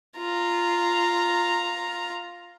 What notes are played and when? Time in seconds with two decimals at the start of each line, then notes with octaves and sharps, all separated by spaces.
0.17 F4 A#5